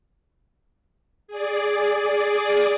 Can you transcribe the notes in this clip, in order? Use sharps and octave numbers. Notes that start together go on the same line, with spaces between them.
G#4 D5